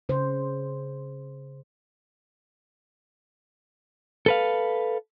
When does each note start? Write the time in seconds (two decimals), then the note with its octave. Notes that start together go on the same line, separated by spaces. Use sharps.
0.09 C#3 C5
4.26 A4 B4 F5